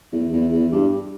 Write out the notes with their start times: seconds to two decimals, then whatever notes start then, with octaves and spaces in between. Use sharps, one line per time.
0.12 E2
0.32 E2
0.52 E2
0.72 G2